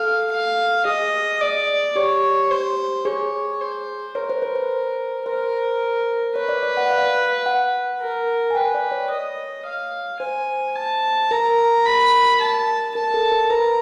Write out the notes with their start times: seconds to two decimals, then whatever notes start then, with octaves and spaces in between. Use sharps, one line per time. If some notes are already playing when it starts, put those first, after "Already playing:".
Already playing: A4 F5
0.31 F5
0.85 G#4 D#5
1.41 D5
1.96 G4 C#5
2.51 C5
3.05 G#4 C#5
3.61 C5
4.15 A#4 C#5
4.30 C5
4.42 B4
4.55 C5
5.26 A#4 C5
6.36 B4 C#5
6.49 D5
6.63 D5
6.77 F#5
6.90 F5
7.46 F#5
8.01 A#4
8.50 G#5
8.55 B4 G5
8.74 D5
8.92 C#5
9.11 D#5
9.66 F5
10.20 C5 G#5
10.75 A5
11.31 A#4 A#5
11.85 B5
12.40 A5
12.95 A#4 A5
13.14 A4
13.32 A#4
13.50 B4 A#5